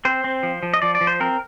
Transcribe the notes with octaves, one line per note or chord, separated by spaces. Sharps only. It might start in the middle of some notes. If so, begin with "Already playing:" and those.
C4 C5
C4
F3
F3
D#5
F3 D5
D5
F3
C5
C4 A#4